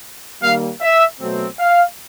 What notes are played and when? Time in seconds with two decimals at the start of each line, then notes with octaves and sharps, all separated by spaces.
0.42 D#3 G3 A#3 F5
0.81 E5
1.20 B2 F#3 A3 C4
1.59 F5